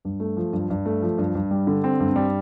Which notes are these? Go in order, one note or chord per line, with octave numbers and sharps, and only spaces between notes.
G2
A3
F3
G2
G2
A3
F3
G2
G2
G3
D3
C4
G2
G3